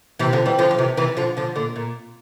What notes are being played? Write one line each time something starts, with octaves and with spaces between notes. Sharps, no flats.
C3 E3
D3 F3
E3 G3
D3 F3
F3
C3 E3
C3 E3
D3 F3
D3 F3
A#2 D3
A#2